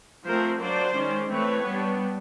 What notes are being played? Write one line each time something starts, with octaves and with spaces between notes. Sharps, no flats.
F3 A3 C4 A#4 C5
F#3 A#3 D4 C5 D5
D#3 G#3 C#4
E3 A3 C4 B4 C#5
G3 B3 D4